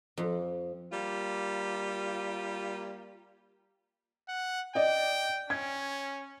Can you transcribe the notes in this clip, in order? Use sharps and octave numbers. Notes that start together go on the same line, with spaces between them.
F2
G3 A#3 F4
F#5
D5 D#5 G5
C#4 G#6